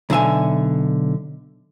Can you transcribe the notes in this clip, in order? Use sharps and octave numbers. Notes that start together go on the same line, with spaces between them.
B1 D3 E5 G#5